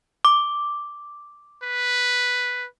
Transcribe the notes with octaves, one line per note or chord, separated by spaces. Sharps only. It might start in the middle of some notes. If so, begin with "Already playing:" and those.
D6
B4